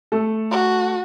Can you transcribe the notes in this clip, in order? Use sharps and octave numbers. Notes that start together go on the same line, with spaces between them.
A3 A4
F#4